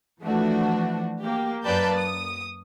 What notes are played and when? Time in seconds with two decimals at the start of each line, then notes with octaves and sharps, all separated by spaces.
0.22 E3 F3 A3 D4 F#4
1.22 A#3 G4
1.65 F#2 A#3 B4 D5 A5 G6
1.97 D#6